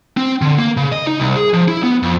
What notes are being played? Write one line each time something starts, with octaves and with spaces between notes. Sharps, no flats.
C4
D3
A#3
C#3
D#5
D#4
C2
G#4
F3
E4
B3
F2